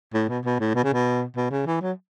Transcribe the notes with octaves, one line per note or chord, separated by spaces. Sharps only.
A2
B2
B2
A2
B2
C#3
B2
B2
C#3
E3
F#3